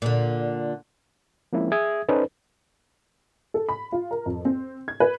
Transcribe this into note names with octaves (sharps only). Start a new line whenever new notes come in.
A#2 D3
F3 G#3 A#3 C4 C#4 E4
G#4 E5 D#6 G#6
C#4 D#4 A4 B4 C5 D5
A4
B5
F4
A#4
F2
C4
G#6
B4